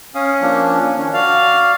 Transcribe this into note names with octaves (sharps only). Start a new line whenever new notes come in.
C#4 F5 D#6
F3 A#3 D4
D#3 C#4 D4
F#4 D5 F5